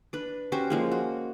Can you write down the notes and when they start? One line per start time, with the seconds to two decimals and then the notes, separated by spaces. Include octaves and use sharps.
0.13 D4 B4
0.52 C#4 F#4 G4 C5
0.70 F3 G#3 A#3
0.92 F#4